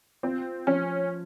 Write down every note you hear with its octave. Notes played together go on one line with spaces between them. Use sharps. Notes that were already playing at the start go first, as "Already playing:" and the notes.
C4 F4
F3 C#4